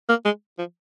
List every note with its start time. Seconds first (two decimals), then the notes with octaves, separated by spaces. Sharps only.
0.09 A#3
0.25 G#3
0.58 F3